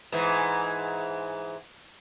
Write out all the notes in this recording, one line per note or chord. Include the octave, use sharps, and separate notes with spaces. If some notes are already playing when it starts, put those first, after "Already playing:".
G#2 E3